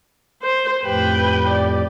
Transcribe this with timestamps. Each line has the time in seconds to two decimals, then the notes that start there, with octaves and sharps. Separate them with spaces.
0.43 C5
0.84 F2 A2 G4 B4 G5
1.50 D5